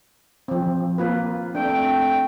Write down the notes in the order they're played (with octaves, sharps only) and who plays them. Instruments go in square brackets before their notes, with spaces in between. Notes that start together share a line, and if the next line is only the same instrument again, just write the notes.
[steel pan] F3 C4
A#3 F4 B4
[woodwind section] A3 C4 G5 [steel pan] D4